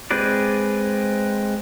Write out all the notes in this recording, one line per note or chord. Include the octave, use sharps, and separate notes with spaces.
G#3 C4 G#4 B4 D5